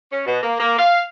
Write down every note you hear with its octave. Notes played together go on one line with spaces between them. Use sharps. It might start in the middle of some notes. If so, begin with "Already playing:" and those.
C#4
B2
A#3
A#3
F5